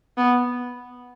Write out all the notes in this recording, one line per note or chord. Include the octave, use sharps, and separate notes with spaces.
B3